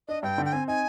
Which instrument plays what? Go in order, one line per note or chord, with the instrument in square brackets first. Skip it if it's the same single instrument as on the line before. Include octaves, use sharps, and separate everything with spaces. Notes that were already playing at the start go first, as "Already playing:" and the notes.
[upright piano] D4 [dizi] D#5
[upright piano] G2 [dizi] G5
[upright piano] D3
[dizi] G5
[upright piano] C4 [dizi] G#5
[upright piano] D#4 [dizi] G#5